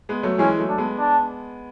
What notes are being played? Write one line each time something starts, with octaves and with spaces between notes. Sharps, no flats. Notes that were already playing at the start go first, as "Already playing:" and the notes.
G#3 B3
F#3 A3
E3 G#3 C#4
F#3 A3
D4
G#3 B3
D4